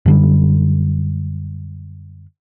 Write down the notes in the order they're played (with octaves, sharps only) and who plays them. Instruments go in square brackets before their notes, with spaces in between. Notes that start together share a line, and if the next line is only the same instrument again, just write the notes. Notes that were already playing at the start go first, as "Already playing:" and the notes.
[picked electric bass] F#2 D3 G3